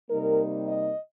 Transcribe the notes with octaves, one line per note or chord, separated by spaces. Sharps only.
C3 G3 A#3 D#4 A#4
D#5